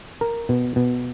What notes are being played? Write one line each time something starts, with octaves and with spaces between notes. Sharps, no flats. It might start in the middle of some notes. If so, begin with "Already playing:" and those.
A#4
B2
B2